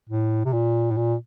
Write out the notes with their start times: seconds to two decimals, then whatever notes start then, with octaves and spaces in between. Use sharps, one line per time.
0.09 A2
0.45 C3
0.53 A#2
0.91 A2
0.97 A#2